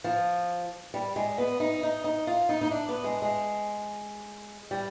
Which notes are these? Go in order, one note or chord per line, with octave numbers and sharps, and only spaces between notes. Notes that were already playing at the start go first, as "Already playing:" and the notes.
F3
G3
G#3
B3
D#4
D#4
D#4
F4
D#4
D#4
D4
B3
G#3
G#3
G3